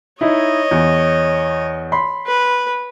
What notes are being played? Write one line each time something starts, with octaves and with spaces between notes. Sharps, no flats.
D#4 E4 C#5 D#5
E2
B5 C6
B4